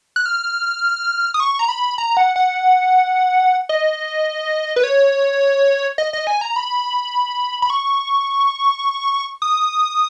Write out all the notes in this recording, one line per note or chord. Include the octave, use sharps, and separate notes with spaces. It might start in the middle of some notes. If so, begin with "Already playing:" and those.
F#6
F6
D#6
C#6
A#5
B5
A#5
F#5
F#5
D#5
B4
C#5
D#5
D#5
G#5
A#5
B5
B5
C#6
D#6